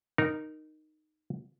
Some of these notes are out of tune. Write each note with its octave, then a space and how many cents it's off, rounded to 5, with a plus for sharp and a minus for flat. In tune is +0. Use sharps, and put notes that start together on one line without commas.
D#4 -10 A#4 +0 A#5 +0